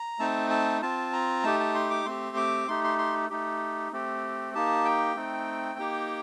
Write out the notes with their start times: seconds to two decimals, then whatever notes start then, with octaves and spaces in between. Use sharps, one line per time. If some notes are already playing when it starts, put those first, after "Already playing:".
Already playing: A#5
0.19 A3 C4 D#4 A5
0.50 A5
0.82 C4 F4 A5
1.13 A#5
1.44 A3 D#4 G4 A5
1.60 A5
1.75 C6
1.90 D6
2.05 A3 C4 G4 C6
2.37 D6
2.68 A3 D#4 G4 C6
2.84 C6
2.98 C6
3.29 A3 D#4 G4
3.92 A3 C4 G4
4.54 A#3 D#4 G4 A5
4.85 G5
5.16 A3 C4 D#4
5.79 A#3 D#4 G4